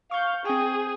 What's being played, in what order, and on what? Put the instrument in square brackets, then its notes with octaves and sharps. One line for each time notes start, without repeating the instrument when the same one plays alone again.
[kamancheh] F5 [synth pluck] C#6 G6
[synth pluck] C4 G5 [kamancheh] G#4